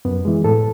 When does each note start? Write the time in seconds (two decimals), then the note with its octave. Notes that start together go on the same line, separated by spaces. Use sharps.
0.05 F#2 B3
0.25 E3 G#3
0.44 A2 A4